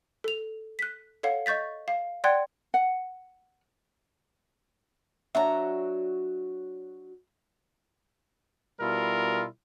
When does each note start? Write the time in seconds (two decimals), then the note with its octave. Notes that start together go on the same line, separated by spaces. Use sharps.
0.24 A4 F7
0.79 F#6 B6
1.23 A4 C#5 F5 F#5
1.46 D#5 C#6 G6 A6 B6
1.88 F5
2.24 D5 F#5 G5 C6 F#6 G#6
2.74 F#5
5.35 F#3 D4 F#4 E5 A#5
8.80 B2 G3 E4 F4 A#4